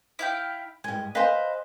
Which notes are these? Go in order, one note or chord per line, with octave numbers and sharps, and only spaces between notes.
E4 F5 G5
G2 G#3 G#5
B4 C5 D#5 F5 G#5